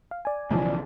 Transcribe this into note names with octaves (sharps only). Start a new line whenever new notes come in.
F5
D5 G#5
B1 C#3 E3 F3